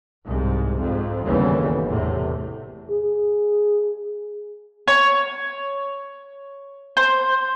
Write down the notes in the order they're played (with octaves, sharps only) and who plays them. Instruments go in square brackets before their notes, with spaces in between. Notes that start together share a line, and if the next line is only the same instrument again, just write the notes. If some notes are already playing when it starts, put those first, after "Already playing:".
[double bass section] C2 G#2
F2 G#2
G1 D#2 C#3 E3 G3 B3
E2 A2 C3
[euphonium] G#4
[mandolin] C#5
C5